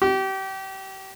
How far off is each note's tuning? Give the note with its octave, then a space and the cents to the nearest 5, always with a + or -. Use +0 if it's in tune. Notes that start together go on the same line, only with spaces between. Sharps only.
G4 -30